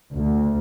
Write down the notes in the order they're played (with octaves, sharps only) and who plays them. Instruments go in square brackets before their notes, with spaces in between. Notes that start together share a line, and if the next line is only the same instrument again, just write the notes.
[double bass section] D2